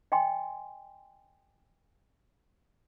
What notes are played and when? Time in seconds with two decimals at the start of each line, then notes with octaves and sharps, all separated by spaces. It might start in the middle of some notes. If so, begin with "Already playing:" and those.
0.12 D#5 G5 G#5 C6